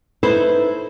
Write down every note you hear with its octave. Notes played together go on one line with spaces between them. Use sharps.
D#4 E4 A4 B4 C5